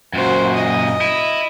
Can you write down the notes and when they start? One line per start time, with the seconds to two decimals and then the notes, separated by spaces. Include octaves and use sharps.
0.13 F#2 A#2 F#4 C5
0.54 D#5
1.01 E4